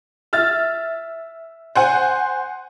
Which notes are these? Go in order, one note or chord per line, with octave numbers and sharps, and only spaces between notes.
E5 F6 A6
C5 F#5 G#5